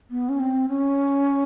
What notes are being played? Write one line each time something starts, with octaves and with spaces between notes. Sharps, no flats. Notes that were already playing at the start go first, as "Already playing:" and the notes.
B3
C#4
C4
C#4